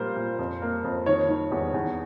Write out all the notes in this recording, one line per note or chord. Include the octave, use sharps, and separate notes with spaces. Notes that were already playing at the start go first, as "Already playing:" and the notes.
Already playing: A#2 G3 A#3 C5
A#2
F2
A#3
F2
D#3 C#5
D#3
E2
E2